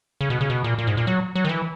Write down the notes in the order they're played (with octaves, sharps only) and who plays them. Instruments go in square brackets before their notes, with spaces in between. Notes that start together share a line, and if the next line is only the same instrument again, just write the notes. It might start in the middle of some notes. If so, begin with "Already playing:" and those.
[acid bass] C#3
B2
C#3
B2
A#2
A#2
G#2
A#2
F#3
F#3
D#3
E3